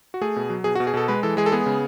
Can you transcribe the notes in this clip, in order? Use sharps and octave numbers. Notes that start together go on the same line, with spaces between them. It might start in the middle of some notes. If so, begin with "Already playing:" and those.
F#4
A3 G#4
B2
F#3
B2 G#4
F#4
B2
G#4
B2 A4
G#3 B4
E3 A4
G#3 G#4
A4
B3 G#4
C#3